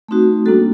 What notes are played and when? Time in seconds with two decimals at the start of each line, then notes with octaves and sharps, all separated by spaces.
0.08 A3 C4 D#4 F#4
0.46 G3 A#3 D4 F#4 A4